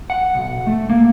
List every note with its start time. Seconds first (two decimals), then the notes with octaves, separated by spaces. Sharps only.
0.10 F#5
0.35 B1
0.67 A3
0.89 A#3